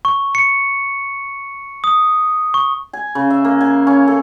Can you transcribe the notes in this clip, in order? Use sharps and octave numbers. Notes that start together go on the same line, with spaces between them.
C#6
C#7
D#6
C#6
G#5
C#3
E5
A#3
G#5
C#4
A4